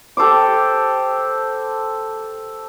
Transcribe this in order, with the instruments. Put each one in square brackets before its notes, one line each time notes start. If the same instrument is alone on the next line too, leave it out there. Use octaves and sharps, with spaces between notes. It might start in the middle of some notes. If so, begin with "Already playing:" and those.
[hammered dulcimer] G4 A4 C5 D6